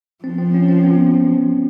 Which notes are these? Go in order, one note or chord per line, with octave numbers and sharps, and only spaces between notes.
F3 C4
C4
C#4
C4
B3